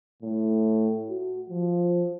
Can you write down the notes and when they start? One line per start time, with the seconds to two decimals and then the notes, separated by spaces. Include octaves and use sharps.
0.23 A2
1.10 F#4
1.49 F3